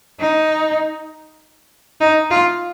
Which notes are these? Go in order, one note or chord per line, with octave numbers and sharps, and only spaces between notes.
D#4
D#4
F4